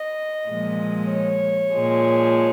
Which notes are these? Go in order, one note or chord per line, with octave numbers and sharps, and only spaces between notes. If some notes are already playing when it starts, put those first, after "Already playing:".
Already playing: D#5
A#2 F3 G#3
C#5
A#2 F3 G#3